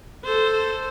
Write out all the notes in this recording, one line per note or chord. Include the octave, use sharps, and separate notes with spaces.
A4 C5